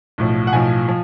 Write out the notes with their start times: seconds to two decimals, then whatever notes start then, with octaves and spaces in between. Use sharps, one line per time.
0.18 B1 A2 F3
0.47 F#5
0.53 B1 A2 F3 G#5
0.88 F3